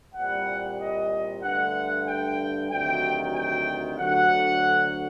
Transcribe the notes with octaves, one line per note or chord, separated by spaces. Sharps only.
C2 A#2 G3 F#5
D#5
G2 D3 A3 F#5
G5
D2 C3 D#3 F#3 G5
G5
D2 D3 F#3 F#5